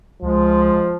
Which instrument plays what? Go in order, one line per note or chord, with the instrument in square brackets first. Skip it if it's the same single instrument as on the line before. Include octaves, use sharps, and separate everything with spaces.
[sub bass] C#2 [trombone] F3 [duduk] G#3